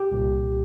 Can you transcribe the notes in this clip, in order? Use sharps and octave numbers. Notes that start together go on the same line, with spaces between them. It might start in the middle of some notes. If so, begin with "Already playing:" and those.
Already playing: G4
C2 A#2